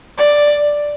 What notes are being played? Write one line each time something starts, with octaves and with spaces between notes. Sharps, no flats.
D5